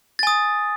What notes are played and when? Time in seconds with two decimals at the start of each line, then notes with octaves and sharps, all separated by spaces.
0.19 A6
0.23 G#5
0.27 D#6